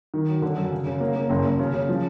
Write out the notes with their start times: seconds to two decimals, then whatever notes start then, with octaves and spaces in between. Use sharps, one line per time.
0.14 D#3
0.28 F#3
0.42 D3
0.56 F#2
0.71 C#3
0.86 C#3
1.00 A#3
1.16 A#3
1.29 F#1
1.45 F#1
1.59 C#3
1.73 C#3
1.89 F3